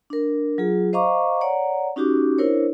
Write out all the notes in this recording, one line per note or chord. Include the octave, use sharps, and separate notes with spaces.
D4 A#4
F#3 F4 G#4
C5 D#5 F5 A#5 C#6 D6
C#5 D5 F#5 A#5
C#4 D#4 F#4 G4 D6
D4 E4 A#4 C5 C#5